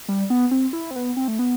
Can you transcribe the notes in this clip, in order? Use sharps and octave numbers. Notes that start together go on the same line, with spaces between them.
G3
B3
C4
E4
C4
B3
C4
A3
B3